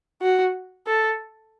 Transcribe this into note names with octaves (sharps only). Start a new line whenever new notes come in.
F#4
A4